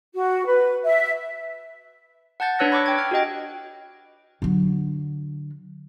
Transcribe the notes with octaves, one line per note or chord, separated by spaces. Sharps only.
F#4
B4
E5
F#5 A5 G6 A6
D4 B4 C#5 E6 F#6 A#6
B5 C#6 D6 E6
G5 G#6
F6
F#4 G4 D#5 G5
D3 F#3